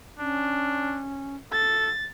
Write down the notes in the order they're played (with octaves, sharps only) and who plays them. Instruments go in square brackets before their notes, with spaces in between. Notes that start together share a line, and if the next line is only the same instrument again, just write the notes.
[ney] C#4 [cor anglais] D4
[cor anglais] A4 [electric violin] A6